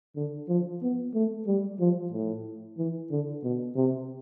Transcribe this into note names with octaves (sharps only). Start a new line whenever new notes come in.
D3
F3
B3
A3
G3
F3
A2
E3
D3
B2
C3